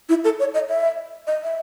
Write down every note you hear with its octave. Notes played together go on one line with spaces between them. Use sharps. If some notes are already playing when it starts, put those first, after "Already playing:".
E4
A4
C#5
D#5
E5
D#5
E5